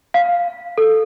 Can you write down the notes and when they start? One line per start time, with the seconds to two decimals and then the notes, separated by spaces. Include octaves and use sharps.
0.14 F5
0.78 A4